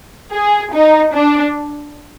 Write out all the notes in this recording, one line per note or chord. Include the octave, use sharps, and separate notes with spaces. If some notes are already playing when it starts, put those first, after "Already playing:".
G#4
D#4
D4